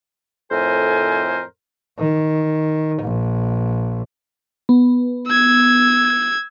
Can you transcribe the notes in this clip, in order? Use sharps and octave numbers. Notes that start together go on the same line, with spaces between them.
F2 A2 A4 A#4 C5 G#5
D#3
A#1
B3
E6 G#6